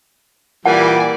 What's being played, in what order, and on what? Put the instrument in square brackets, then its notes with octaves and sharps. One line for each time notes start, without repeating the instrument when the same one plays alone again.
[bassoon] A#2 [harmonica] E3 G3 [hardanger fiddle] D5 G#5 [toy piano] F#5